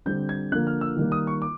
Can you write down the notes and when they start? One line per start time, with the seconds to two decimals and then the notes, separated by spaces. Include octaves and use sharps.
0.06 D3 G3 C4 G6
0.29 G#6
0.52 D3 F3 A#3 F#6
0.67 F6
0.81 E6
0.96 D#3 G3 A#3
1.12 D#6
1.27 C#6
1.42 D6